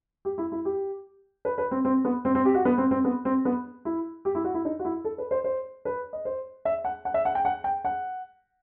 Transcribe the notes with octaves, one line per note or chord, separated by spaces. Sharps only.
G4
E4
E4
G4
B4
B4
C4
C4
B3
C4
C4
G4
F#4
B3
C4
C4
B3
C4
B3
E4
G4
E4
F#4
E4
D#4
F#4
E4
A4
B4
C5
C5
B4
D#5
C5
E5
F#5
F#5
E5
F#5
G5
F#5
G5
F#5